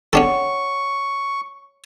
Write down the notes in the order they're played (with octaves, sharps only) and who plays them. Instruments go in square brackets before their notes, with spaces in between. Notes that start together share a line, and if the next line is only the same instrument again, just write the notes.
[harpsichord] C#4 D4 A4 [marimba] C#5 F#5 G5 [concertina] C#6